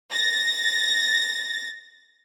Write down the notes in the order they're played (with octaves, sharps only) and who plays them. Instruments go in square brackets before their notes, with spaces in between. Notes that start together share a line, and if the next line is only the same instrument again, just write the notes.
[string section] A6 A#6